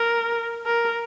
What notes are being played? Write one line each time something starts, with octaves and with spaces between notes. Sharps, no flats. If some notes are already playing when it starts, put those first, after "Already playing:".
Already playing: A#4
A#4